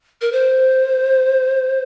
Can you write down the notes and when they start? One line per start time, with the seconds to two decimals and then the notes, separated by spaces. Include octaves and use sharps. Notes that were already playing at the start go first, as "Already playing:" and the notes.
0.21 A#4
0.32 C5